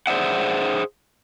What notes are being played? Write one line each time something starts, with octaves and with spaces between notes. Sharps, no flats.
G#4 C5 D5 E5 F#5